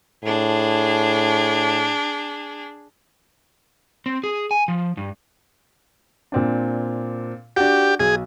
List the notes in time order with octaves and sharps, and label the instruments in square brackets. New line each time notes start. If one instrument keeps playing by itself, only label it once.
[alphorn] A2 [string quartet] D4 G#4
[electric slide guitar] C4
G#4
G#5
F3
G2
[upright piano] A#2 C4 D4
[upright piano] D4 F#4 [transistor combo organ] G4
[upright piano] B1 [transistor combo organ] G#4